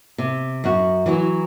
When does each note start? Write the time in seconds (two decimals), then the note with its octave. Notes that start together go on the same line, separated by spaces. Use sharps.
0.18 C3
0.64 F#2 F#4
1.06 E3 F#3 F#4